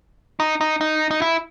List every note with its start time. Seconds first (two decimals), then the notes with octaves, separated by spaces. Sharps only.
0.40 D#4
0.61 D#4
0.81 D#4
1.11 D#4
1.22 E4